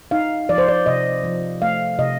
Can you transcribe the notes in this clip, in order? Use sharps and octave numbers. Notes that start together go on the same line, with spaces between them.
D#4 F5
F3 D5
C5
D5
C3 D#5
F3
A3 F5
C3 D#5